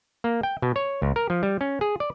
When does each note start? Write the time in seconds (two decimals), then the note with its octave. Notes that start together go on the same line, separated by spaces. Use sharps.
0.24 A#3
0.43 G5
0.62 B2
0.76 C#5
1.02 C#2
1.16 A#4
1.30 F3
1.43 G3
1.61 C#4
1.81 G#4
2.00 D5